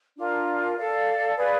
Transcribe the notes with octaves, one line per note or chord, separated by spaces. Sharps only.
D4 F4 A#4
A4 D5 F5
G#4 B4 D5 F5